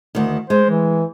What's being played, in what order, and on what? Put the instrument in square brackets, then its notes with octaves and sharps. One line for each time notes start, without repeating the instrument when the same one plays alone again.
[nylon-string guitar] D2 D#3
[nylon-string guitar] G#3 [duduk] C5
[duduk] E3